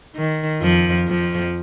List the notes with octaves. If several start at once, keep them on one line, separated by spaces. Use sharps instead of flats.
D#3
F2 F3
F2 F3